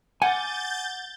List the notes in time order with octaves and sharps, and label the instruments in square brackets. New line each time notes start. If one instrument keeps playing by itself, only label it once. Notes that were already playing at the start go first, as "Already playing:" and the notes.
[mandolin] F#5 D6 F6 [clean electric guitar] G#5 [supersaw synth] G6 A6